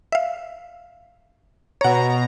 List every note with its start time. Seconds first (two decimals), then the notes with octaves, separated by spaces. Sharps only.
0.12 E5 F5
1.81 B2 C#5 F#5 A#5